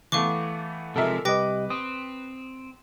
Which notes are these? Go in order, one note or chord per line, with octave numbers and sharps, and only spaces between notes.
E3 A3 B3 F5 C#6 D6
C3 F3 G#3 A4 A#4 E5
C2 G4 B4 D#5 G5 D6 A#6
C4 D#6